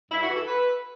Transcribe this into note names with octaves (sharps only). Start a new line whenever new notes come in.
G2 E4
F#4
E3
A4
B4